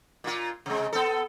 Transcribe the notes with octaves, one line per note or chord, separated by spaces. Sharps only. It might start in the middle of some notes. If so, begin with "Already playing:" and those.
A#2 F4
C3 G#3
B3 A4